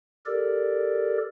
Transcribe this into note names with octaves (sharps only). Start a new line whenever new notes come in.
G4 A4 A#4 D5